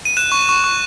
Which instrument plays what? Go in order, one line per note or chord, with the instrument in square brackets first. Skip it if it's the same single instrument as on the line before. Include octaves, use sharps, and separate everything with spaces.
[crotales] D#7
F#6 E7
C#6
C#6
C#6